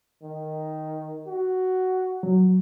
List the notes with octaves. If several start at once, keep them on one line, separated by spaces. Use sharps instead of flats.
D#3
F#4
F#3